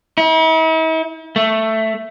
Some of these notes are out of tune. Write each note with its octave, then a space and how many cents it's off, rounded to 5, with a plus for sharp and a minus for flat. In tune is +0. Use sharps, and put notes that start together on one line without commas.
E4 -45
A3 +5